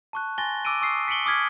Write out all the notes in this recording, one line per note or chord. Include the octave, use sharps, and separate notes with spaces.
A5 C#6 F#6
G#5 C6 A6 A#6 G7
D6 E6 D7 D#7
C#6 D#6 E6 C7
B6 C#7 D7 F#7 G7
D6 D#6 F6 G#6 B6